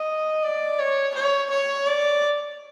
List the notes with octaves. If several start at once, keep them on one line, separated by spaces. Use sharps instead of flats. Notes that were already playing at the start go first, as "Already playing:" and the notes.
Already playing: D#5
D5
C#5
C#5
C#5
D5